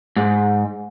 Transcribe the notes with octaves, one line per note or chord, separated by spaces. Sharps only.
G#2